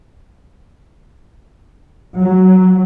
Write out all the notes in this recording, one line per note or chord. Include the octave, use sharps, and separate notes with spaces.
F#3